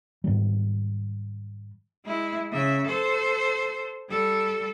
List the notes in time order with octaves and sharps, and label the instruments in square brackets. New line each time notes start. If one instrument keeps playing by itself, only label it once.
[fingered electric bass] G#2 D#3 G3
[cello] G#3 E4
C#3 E5
A4 C5
G3 A4